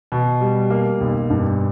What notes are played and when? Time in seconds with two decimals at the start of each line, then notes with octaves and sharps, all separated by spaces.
0.12 B2
0.41 G3
0.70 A#3
1.01 B1
1.30 G2